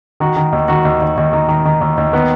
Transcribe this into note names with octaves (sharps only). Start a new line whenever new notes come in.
D#3 F#4
D#3
D#2
D#3 F#4
D#2
D#2
D#2
D#3
D#3
D#3
D#2
D#2
D#3 B3